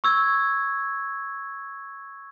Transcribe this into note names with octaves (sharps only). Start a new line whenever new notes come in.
C#6 E6 G#6